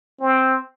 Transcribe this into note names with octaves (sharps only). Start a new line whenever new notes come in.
C4